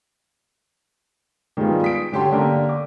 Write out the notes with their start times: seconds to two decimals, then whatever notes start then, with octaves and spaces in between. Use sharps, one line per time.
1.57 D#3 G3 G#3 B3 F4 G4
1.82 D#6 B6 D7
2.12 D3 C#4 G4 F#5 A5 C6
2.32 D3 A#3 D4 G4 A#4
2.69 D6